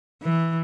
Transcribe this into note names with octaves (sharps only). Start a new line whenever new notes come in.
E3